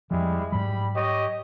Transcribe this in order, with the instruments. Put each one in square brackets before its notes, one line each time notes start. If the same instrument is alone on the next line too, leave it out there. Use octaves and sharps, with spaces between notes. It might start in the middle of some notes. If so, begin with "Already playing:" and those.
[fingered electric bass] F2 F3 [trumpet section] G3 G#3 E4
[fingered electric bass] G#2 F#3 [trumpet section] G3 B5
[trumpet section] G4 C#5 D#5